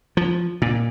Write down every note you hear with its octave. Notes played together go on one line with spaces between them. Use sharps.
F3
A#2